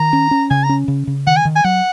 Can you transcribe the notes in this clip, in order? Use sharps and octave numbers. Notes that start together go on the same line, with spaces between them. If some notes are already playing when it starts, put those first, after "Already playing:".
Already playing: D#3 A#5
C#4
C#4
C#3 G#5
A#5
C#4
C#3
C#3
D#3 F#5
G#5
D#3
G#5
F#3 F#5